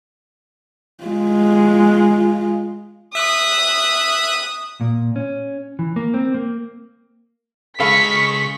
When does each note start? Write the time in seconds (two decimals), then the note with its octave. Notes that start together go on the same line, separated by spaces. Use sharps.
1.04 G#3 F4
3.15 E5 D#6 F#6
4.81 A#2
5.16 C#4
5.79 E3
5.96 A#3
6.14 C4
6.34 A#3
7.80 C#3 G#3 A4 F5 B5 C#6 B6